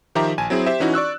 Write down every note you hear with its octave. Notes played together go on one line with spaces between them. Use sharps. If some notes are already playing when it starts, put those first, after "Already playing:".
D#3 F3 G4 E5 A#5 D6
A#1 G#5 A5
F#3 C4 E4 G#4
G4 C5 E5
E3 C#4 D#4 E4 F#4
D5 C#6 E6 F#6